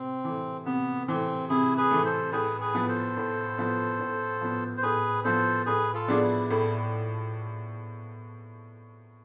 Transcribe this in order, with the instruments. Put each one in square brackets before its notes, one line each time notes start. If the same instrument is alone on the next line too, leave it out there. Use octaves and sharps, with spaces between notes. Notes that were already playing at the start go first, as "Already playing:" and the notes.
Already playing: [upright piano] C3 [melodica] C4
[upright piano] E3 A3
[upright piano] C3 [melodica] B3
[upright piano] E3 A3 [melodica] C4
[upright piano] C3 [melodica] E4 G#4
[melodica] G#4 B4
[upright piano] E3 A3
[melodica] A4 C5
[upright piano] A2 [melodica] G#4 B4
[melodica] G#4 B4
[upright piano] F3 B3
[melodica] A4 C5
[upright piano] A2
F3 B3
A2
F3 B3
[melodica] C5
[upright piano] A2 [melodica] G#4 B4
[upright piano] F3 B3 [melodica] A4 C5
[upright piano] A2 [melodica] G#4 B4
[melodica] F4 A4
[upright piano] F3 B3 D4 G#4
[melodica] E4
[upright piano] A2 [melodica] E4